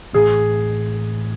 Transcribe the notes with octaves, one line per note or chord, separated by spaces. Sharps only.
A2 E3 C4 G#4